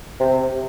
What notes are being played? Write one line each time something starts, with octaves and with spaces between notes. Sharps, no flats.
C3